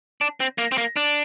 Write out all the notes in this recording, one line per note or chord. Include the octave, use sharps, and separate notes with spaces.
D4
C4
A#3
C4
A#3
D4